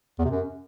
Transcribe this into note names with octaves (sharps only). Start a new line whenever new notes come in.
E2
C3
F#2